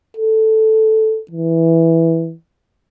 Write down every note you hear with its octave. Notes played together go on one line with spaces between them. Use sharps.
A4
E3